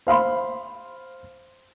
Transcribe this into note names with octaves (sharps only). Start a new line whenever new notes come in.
C5 F5 B5 C6